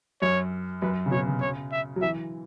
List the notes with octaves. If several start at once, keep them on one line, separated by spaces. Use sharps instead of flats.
F#2 C#5
F#2 B4
C#3
B2 C#5
C#3
C#5
E5
F#3
E3 E5